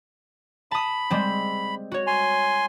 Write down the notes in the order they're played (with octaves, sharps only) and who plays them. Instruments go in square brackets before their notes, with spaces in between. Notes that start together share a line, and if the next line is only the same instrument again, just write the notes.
[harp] A5 D#6 [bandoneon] B5
[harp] G3 G#3 C4
F#4 C#5
[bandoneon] G#5 C6